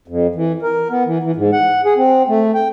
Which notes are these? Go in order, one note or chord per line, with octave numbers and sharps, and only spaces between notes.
F2
E3
A#4
B3
E3
E3
G#2
F#5
G#4
C4
A3
G5